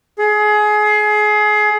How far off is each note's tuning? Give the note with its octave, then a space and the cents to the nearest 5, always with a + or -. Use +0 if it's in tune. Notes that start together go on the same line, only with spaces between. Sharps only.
G#4 +25